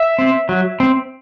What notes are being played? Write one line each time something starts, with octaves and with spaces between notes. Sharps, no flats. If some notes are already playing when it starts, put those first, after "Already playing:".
Already playing: E5
C4
F#3
C4